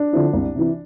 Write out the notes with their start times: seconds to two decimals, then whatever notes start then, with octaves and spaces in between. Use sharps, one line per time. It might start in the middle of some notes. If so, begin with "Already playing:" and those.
Already playing: D4
0.13 D3 F3 C4 E4
0.33 C2
0.55 C3 E3